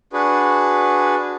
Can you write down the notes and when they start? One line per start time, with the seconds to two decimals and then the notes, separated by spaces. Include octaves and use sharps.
0.13 D4 F#4 G#4 B4